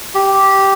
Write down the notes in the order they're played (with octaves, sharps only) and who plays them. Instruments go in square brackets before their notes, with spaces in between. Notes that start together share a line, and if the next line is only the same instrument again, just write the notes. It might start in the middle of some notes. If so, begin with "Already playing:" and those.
[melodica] G4